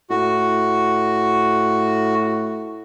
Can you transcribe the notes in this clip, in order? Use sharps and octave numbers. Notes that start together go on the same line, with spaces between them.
A2 F#4